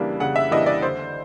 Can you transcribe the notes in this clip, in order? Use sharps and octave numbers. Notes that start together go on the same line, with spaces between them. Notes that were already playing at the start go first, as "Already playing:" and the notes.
Already playing: C#3 E3 G3 A#3 D4
C#3 F#5
E5
E3 G3 A#3 D4 D#5
D5
D3 C5